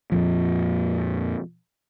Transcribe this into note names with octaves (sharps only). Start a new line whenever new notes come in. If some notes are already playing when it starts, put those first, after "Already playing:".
F2 A#2 F3